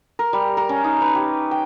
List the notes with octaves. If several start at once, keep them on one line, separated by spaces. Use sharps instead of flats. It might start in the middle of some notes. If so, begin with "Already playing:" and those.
A#4
G3
A#4
C#4
D#4
B4
G4
G5